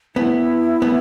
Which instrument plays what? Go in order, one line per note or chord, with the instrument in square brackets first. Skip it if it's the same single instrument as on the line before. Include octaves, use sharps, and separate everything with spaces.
[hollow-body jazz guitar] B3 [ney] E4
[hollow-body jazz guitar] B3